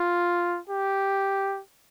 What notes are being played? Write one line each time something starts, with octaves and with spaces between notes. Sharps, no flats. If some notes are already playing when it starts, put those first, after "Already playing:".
Already playing: F4
G4